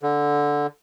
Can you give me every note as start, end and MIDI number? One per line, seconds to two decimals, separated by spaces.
0.03 0.67 50